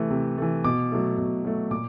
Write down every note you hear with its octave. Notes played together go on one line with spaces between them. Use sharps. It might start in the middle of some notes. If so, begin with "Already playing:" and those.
Already playing: C3 E3 A3
C3
E3 A3
B2 D6
F#3 A3
B2
F#3 A3
A#2 D6